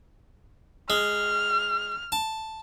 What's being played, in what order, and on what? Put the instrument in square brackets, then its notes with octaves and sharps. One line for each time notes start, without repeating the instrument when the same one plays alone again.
[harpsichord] G#3 [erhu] F6
[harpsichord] A5